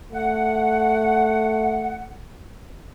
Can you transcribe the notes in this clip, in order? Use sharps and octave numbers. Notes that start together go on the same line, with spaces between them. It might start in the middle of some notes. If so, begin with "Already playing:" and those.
A3 F#5